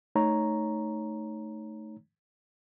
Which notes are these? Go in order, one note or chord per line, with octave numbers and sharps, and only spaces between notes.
A3 D#4 C#5 A#5